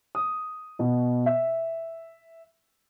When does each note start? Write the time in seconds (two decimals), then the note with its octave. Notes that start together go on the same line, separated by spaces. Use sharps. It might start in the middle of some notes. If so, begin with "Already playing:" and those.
0.15 D#6
0.79 B2
1.26 E5